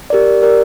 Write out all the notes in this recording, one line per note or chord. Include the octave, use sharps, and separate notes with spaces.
G4 A#4 D5
G4 A#4 D5